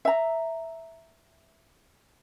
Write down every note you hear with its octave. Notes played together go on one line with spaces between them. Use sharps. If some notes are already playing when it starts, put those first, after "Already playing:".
E5 A#5